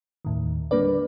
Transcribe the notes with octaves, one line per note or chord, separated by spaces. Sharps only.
D#2 A2 D#3
D3 G3 A#3 D4 B4 D5